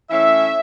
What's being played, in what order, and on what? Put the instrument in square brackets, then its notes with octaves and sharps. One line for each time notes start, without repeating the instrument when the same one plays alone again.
[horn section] E3 A3 C#4 E5